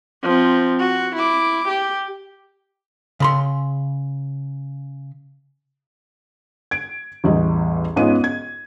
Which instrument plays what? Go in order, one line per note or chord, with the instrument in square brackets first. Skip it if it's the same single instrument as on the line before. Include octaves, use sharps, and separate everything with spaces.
[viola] F3 C4
F#4
E4 D6
G4
[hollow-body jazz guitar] C#3 B5 C6
[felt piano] G#6 D7
A1 E2 G3 D#5
G#2 B3 C#4 F4 D#5 D#7
G#6